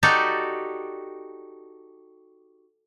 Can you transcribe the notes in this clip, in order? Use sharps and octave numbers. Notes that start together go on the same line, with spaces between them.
D#4 F#4 G4 A4 D5